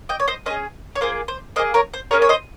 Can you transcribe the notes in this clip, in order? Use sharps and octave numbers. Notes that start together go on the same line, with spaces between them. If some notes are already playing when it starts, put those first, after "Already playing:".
D#5 G5
C#5
C5 D#5
C#4 G#4 C5 D#5
C#5
A#3 F4 G#4 C5
C5
A#3 F4 G#4 C5 D#5
A#4 C#5
C5
A#3 C#4 G#4 A#4 C#5
C#5
C5 D#5